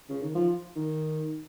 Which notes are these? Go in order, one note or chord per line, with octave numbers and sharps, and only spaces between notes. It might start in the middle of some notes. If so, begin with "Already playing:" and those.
C#3
D#3
F3
D#3